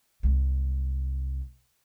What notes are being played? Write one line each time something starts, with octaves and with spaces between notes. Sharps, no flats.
C2 G#3